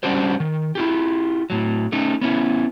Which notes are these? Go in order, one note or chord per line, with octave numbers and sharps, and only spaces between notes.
G3 C#4 D4 F#4 G4 C5
D#3
E4 F4 G4
A2 F#3
A3 C#4 D#4
B3 C#4 E4